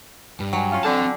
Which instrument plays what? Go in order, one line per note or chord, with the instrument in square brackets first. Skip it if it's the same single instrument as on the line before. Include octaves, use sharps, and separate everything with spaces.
[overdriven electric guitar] G2
[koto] F#3 [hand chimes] G5 G#5
[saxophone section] C#4 F4
[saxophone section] D3 [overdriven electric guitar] C4 A5